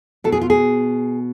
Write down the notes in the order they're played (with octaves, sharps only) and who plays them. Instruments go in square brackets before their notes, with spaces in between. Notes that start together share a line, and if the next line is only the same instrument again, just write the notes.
[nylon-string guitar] B2 A4
G#4
F4
G#4